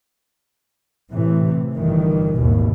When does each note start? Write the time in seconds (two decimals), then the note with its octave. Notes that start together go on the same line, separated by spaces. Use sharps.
1.10 A2 C3 E3
1.74 G1 D#3 E3
2.38 G#1 D#2 B2